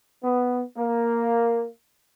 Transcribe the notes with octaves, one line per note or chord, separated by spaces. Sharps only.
B3
A#3